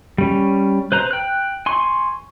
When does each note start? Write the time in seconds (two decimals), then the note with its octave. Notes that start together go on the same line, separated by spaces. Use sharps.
0.18 G3 C#4
0.92 B4 C5 A#5
1.11 G5 F#6
1.66 G#5 C6 C#6